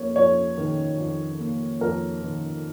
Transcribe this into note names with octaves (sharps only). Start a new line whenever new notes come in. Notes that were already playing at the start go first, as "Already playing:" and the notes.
Already playing: F2 A#3 C#5
F2 C#5
D#3
F2
A#3
F2 A#4
D#3